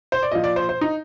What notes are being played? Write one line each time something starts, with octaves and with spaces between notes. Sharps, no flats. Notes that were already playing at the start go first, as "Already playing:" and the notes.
C5
D5
A#2 F3 D#5
D5
C5
C5
D#4